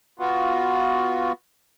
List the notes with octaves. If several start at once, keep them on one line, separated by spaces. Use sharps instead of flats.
B3 F4 F#4